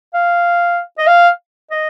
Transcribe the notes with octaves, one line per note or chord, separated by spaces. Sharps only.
F5
D#5
F5
D#5